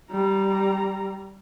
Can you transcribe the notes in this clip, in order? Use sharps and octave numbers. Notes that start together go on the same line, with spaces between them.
G3 A#5